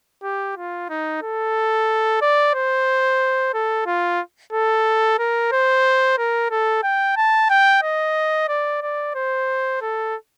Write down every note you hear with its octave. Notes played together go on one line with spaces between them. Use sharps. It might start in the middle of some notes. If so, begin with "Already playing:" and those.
G4
F4
D#4
A4
D5
C5
A4
F4
A4
A#4
C5
A#4
A4
G5
A5
G5
D#5
D5
D5
C5
A4